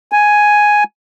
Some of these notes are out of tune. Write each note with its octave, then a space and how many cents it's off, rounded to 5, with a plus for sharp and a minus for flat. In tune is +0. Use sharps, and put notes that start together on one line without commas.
G#5 +5